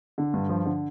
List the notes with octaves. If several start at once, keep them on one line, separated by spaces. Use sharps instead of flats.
D3
G2
F3
D3